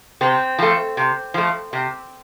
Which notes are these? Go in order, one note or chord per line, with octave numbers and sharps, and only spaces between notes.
C3 C4
F3 A3
C3
F3 A3
C3